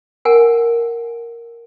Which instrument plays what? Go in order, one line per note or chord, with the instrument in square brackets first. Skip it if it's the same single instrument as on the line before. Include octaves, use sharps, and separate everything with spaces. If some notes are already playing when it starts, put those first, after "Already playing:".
[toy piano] A#4 F#5 G#5